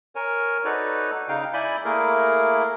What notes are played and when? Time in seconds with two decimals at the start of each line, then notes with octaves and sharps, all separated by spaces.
0.15 A#4 C#5 G#5
0.65 D#4 F#4 A4 B4 C#5 D5
1.28 C#3 D#4 F5 G5
1.54 E4 D5 G#5 B5 G6
1.85 A3 A#3 E4 G#4 A#4